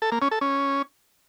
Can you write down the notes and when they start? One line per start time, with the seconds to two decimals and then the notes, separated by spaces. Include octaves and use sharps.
0.02 A4
0.12 A#3
0.22 C#4
0.31 A4
0.41 C#4